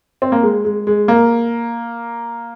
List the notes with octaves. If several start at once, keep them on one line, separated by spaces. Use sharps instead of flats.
C4
A#3
G#3
G#3
G#3
A#3